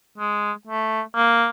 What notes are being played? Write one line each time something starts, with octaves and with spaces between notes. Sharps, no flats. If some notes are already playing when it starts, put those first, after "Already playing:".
G#3
A3
A#3